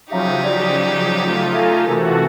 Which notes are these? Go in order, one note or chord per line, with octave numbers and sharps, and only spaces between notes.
C#3 F3 F#3 D#4 G4 E5 F5 A#5
F#4 D5
A3 F4
E5 F5 G#5 A#5
C3 E3 A3 F4 F#4 A4 A#4 G#5